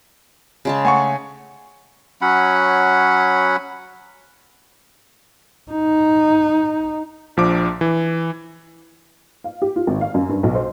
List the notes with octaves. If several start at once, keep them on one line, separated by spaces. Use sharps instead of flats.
C#3 G#3 A5
A3 F#5 G#5 C#6
F#3 C#4 F#5 B5
D#4
A#1 F3 D4 D6
E3
F5
G4
F4
G#1
F5
F#2
G2
B1
C5